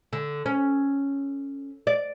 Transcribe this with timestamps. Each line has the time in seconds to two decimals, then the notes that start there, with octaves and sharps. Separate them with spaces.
0.13 D3
0.46 C#4
1.87 D5